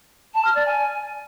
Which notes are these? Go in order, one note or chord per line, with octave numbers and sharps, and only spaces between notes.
A5
F6
D5
G#5